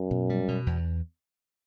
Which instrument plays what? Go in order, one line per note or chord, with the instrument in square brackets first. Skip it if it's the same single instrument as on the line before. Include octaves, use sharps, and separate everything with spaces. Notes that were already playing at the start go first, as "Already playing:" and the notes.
Already playing: [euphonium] F#2
[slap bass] B2
G3
B2
E2